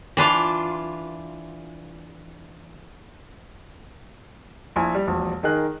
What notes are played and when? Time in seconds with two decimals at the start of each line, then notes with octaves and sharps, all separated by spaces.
0.17 E3 D4 F4
4.76 A#1 E4 G#5
4.95 G3
5.07 E1 A#1
5.43 D#3 D#4 G#4 A#4 F#6